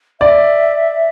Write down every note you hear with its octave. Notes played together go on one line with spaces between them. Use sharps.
D5 E5